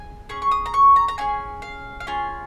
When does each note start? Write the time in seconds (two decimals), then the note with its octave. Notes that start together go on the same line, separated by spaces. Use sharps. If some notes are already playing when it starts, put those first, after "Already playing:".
Already playing: G#4 G#5
0.29 C#4 G#4 C#6
0.42 C#6
0.51 D#6
0.66 A#5
0.74 C#6
0.96 A#5
1.08 A#5
1.18 C#4 F4 G#4 G#5
1.62 F5
2.00 F5
2.07 C#4 F4 G#4 G#5